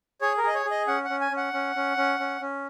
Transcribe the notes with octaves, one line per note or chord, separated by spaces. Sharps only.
G#4 C#5
A#4
G#4 D#5
C#5
G#4
D#5
C#4 F#5
F#5
C#4
G#5
C#4
F#5
C#4
C#4
C#4
C#4
C#4